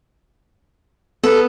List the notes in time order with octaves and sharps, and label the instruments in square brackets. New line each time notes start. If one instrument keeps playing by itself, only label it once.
[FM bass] B3 [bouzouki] A4